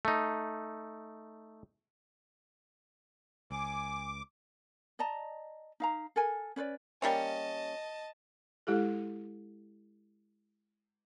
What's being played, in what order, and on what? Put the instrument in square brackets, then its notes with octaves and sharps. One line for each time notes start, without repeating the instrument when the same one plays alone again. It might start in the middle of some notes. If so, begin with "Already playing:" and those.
[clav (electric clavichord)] A3 D#4
[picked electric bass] C#2 [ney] G#5 [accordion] D6
[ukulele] D5 D#5 A5 A#5
D#4 F5 A#5
A4 A#4 G#5
C#4 B4 C5 D5
[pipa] G3 A#3 C#4 [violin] D#5 A5
[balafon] G#3 E4 G4 A4